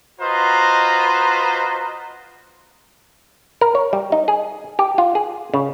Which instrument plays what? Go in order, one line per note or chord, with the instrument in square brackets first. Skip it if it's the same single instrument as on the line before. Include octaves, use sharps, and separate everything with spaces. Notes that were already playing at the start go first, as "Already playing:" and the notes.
[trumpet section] F4 F#4 B4 C5 D#5 A#5
[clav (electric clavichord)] A#4
C#5
G3
D#4
G#4
G4
F4
G#4
C#3